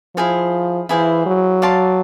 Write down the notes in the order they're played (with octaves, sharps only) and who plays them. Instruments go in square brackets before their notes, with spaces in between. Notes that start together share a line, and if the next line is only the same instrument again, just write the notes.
[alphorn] F3 [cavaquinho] E4 G#4 C5 F5
[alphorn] E3 [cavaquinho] E4 G#4 C5 F5
[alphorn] F#3
[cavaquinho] D5 F5 A5 C6